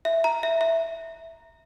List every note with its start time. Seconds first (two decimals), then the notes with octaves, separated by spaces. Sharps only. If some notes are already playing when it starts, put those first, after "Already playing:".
0.05 E5
0.24 A#5
0.43 E5
0.61 E5